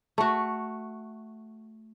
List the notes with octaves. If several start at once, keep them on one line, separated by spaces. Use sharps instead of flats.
A3 F#4